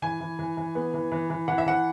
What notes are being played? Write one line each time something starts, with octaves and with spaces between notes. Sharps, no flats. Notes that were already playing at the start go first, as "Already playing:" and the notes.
E3 G#5
E3
E3
E3
B3
E3
E3
E3
E3 F#5
E5
E3 F#5